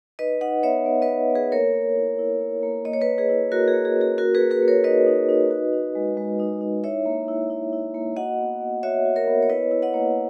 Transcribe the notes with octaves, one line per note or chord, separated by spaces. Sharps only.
D#4 B4 D#5
D#4 D#5 F#5
B3 C#5 E5
B3
B4 D#5
B3
B3
G#4 B4
A#3 A#4 C#5
A#3
E4
E4
A#3
A#3
A#3 D#5
C#5
B4 D#5
A#3
G#4 B4
E4
A#3 F#4 A#4
G#4
A#3
G#4
C#4
G#4
F#4 A#4
G#4 B4
A#3
G#4 B4
A#3
A#4 C#5
D#4 B4 D#5
D#4
D#4
F#4
D#4
G#3
G#3
D#4
D#4
E4 C#5 E5
A#3
E4
E4
E4
A#3
F#4 D#5 F#5
B3
B3
F#4 C#5 E5
F#4
A#4 C#5
B3
C#5
E4 B4 D#5
E4
D#5 F#5
A#3